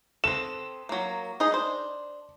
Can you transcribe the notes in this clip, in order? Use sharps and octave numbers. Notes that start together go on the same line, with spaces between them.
C4 A4 E7
F#3 A#3
D#4 G#4 D#5
D4 C5